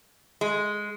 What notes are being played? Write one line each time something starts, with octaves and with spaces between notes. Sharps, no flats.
G#3